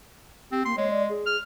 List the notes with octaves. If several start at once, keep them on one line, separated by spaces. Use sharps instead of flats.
C4 G4
A#3 C6
G#3 C#5
D5
G#4
F6